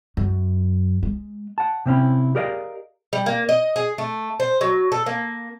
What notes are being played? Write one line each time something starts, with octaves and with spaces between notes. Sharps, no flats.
F#2
G#3
F#5 A5
C3 C4 C#4 E4
G4 G#4 A#4 D5 D#5 F5
G3
A#3
D#5
G#4
A3
C5
F#3
A4
A#3